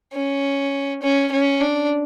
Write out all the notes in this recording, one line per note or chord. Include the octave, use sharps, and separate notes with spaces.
C#4
C#4
C#4
D4